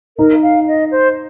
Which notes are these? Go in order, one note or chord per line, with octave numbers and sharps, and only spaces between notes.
D#4 A#4
F5
D#5
C5